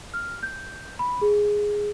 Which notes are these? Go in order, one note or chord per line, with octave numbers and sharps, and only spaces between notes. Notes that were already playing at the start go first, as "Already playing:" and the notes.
F6
G6
B5
G#4